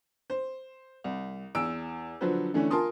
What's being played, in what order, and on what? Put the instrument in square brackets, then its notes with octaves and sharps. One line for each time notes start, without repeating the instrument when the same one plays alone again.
[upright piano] C5
C2
E2 E6 D7
D3 F3 F#3 B4 C5
D3 E3 A3 C#4 D4
F4 A#4 G#5 A5 C6 D#6